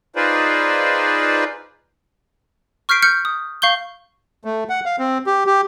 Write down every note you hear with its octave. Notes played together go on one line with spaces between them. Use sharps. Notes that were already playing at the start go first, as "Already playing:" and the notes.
D#4 F4 G#4 B4 C5 D5
C#6 F6 G6 B6 C7 D7
F6 G6 C#7
D#6
F5 C#6 G6 G7
A3
F#5
F5
C4
G4
G4